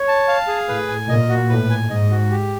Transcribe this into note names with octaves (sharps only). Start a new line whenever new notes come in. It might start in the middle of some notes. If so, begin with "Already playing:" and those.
Already playing: C#5
A5
F5
G#4
A2 B4
G#5
A#2 D#5
F#4
A2 B4
G#5
G#2 D#5
F#4
G4